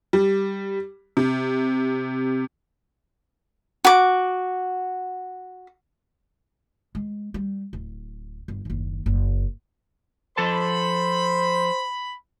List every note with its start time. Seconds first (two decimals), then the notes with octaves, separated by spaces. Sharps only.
0.13 G3
1.17 C3
3.85 F#4 D6
6.95 G#3
7.34 G3
7.73 D1
8.48 G1
8.65 F#1 D#2
9.06 F#1
10.37 F3 A4 C5 A5 B5